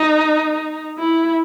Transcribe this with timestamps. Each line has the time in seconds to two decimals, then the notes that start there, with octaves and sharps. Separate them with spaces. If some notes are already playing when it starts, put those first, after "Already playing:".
Already playing: D#4
0.99 E4